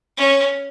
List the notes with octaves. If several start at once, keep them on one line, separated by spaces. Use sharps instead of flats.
C#4